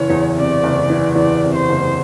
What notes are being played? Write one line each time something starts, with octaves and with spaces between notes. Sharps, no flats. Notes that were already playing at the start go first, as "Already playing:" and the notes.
Already playing: F#1 E3 C#5
E2
C3 D5
F#1
E3
E2 D5
C3
C5
F#1